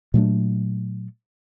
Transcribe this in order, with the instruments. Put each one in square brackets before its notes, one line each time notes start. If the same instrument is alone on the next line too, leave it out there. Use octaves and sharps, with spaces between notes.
[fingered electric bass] A#2 F#3 A3 D4